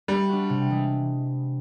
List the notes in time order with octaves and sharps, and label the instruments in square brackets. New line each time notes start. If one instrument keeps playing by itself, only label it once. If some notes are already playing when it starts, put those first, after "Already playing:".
[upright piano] G3 [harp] A3
[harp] D4 F#4
C3
E3 G#3